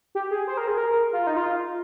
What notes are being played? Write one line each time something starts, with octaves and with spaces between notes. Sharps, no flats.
G4
G#4
C5
A#4
G#4
A#4
F4
D#4
F4